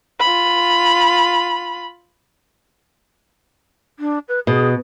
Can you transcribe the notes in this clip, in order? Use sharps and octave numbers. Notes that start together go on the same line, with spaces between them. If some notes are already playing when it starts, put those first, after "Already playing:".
F4 B5
D4
B4
B2 G#4